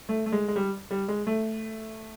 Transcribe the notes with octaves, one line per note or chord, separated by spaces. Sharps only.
A3
A3
G#3
G#3
G3
G3
G#3
A3